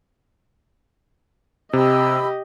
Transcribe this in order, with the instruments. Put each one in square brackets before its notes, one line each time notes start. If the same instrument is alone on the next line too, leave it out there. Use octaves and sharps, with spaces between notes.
[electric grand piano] C3 [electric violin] G4 D#5 [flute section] B5 E6